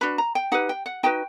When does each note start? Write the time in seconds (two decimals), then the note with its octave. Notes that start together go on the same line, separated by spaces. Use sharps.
0.01 D4 F#4 B4 B5
0.18 A#5
0.35 G5
0.52 D#4 G4 B4 F#5
0.69 G5
0.86 F#5
1.03 D#4 F#4 B4 G5